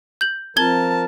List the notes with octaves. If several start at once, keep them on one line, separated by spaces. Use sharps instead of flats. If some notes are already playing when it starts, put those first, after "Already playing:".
G6 F#7
F3 C4 F4 A#4 A5 G#6 G7